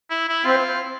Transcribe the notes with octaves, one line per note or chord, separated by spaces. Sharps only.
E4
E4
C4 F4